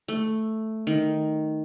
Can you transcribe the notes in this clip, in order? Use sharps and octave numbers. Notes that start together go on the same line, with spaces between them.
A3
D#3